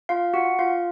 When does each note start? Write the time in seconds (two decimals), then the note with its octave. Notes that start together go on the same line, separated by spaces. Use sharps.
0.09 F4 F5
0.34 F#4 F#5
0.59 F4 F5